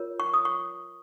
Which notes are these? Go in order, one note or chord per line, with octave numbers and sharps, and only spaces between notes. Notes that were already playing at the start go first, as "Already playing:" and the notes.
Already playing: F4 A#4 C#5
C#6
D#6
C#6